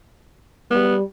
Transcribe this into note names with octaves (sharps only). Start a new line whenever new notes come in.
G3 B3